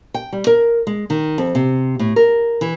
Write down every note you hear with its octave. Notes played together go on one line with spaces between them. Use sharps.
G5
G3
A#4
G#3
D#3
F2
C3
A2
A#4
E3